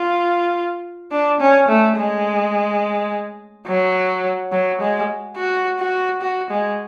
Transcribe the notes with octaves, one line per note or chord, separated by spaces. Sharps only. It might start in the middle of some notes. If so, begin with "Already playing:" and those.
Already playing: F4
D4
C#4
A3
G#3
F#3
F#3
G#3
F#4
F#4
F#4
G#3